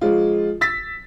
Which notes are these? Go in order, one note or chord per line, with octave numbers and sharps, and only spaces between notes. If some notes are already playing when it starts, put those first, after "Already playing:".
F3 G#3 F4
E6 A6 B6